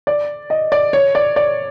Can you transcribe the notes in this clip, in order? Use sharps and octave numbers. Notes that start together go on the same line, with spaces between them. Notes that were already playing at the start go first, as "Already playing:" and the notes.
D5
D#5
D5
C#5
D5
D5